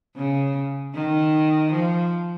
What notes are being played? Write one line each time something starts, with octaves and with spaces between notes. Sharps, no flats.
C#3
D#3
F3